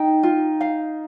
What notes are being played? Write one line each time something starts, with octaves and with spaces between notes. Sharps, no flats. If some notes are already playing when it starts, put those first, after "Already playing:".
Already playing: D#4 G5
F4
F5